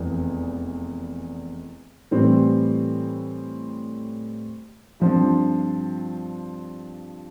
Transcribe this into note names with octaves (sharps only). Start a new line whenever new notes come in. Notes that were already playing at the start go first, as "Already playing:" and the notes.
Already playing: F1 E2 E3
A2 E3 G3 C4
G2 F3 C4 F4